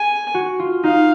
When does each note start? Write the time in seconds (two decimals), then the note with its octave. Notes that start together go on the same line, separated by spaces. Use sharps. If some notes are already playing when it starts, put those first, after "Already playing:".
Already playing: G#4 G#5
0.34 F#4
0.59 F4
0.84 D#4 F5